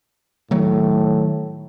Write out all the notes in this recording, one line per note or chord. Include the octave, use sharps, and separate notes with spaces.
A2 D#3 F#3 A3